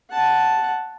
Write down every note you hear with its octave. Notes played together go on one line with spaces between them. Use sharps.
F#5 A5